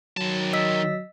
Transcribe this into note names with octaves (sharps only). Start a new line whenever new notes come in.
D#3 F#3 A5
D#5 E6 B6